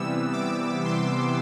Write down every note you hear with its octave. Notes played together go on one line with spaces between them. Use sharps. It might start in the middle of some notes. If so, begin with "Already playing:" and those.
Already playing: C3 E3 G3 B3 E6
D6
C6